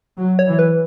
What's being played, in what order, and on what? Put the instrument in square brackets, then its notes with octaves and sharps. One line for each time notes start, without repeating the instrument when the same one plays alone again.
[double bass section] F#3
[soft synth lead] C#5
[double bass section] E3
[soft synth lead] B4